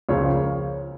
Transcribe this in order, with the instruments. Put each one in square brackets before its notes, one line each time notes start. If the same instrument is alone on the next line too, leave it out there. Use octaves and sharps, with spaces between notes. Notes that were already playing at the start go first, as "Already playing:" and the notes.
[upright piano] C#2 C#3 F3 A#3 C#5